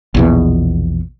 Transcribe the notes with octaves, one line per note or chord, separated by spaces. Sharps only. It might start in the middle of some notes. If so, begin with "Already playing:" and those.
A#1 E2 B2